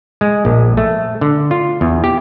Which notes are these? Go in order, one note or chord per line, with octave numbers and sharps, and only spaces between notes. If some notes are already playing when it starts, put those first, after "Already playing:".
G#3
A#1
A3
D3
F4
E2
G4